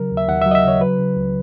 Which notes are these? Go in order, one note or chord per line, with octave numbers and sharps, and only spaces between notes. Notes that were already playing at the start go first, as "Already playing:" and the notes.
Already playing: C#3 F#3 A#4
D#2
E5
D#2 F#5
E5
F#3
D#5
E5
C#3 C#5
F#3 B4
C#3
C#2